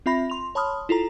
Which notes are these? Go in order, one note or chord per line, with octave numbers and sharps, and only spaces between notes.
C4 F4 E5 B5 A#6
C6 F7
C#5 A5 B5 C6 D#6 F6
E4 F4 A4 A#5